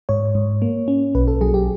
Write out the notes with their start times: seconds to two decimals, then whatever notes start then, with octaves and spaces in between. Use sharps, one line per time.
0.09 G#2 C#5
0.35 G#2
0.62 A#3
0.88 C#4
1.15 B1 B4
1.28 A4
1.41 F#3 G#4
1.54 G4